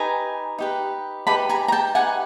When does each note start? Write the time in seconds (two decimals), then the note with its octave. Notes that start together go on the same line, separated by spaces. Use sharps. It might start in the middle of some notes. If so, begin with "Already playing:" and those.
Already playing: D#4 G4 B4 G#5 A#5
0.58 D#4 G4 B4
1.27 D#4 G4 B4 A5 B5
1.49 G#5 A#5
1.68 A#5
1.72 G5 A5
1.95 D#4 G4 B4 F#5 G#5